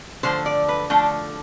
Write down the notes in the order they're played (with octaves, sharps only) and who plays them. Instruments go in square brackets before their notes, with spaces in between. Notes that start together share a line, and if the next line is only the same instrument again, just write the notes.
[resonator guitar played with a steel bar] D3 F3 A3 C5
D5
B4
D3 F3 A3 D4